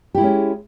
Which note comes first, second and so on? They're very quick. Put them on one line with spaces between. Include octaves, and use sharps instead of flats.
G4 E4 G#3 C#4